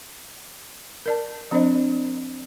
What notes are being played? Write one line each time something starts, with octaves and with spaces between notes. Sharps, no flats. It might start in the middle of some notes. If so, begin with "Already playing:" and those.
A#4 D5 A5
F3 C4 D4 C5 D5 D#5